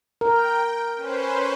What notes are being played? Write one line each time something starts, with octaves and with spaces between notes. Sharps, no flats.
A#4 G5
C#4 B4 C5